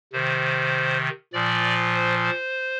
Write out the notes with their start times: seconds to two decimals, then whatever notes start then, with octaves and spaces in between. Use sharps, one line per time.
0.13 C3 D#3 C5
1.33 A#2 F3 D5
1.94 C5
2.24 C5